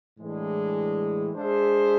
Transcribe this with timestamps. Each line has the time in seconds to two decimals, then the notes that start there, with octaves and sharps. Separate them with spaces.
0.17 A2 E3 G#3 D4
1.33 G#3 D4 G#4 C5 E5